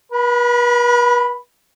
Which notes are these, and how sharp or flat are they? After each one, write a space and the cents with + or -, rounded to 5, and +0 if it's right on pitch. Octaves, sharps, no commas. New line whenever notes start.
B4 -40 B5 +0